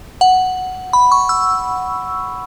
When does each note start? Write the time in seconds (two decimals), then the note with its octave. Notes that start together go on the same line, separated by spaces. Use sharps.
0.21 F#5
0.93 B5
1.12 C#6
1.29 E6